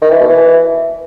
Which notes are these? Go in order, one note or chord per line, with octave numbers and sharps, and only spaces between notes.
D#3
E3
B2
E3